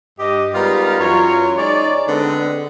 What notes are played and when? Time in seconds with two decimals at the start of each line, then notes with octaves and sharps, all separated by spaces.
0.19 G2 G4 D#5
0.55 G3 G#3 B3 D#4 F4 A#4
1.00 F#2 E3 F4 A#4 C#5
1.58 G#3 D#4 C#5 D5
2.08 D3 G#3 B3 C4